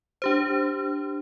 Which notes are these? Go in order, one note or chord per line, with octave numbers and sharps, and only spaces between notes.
D4 G4 C5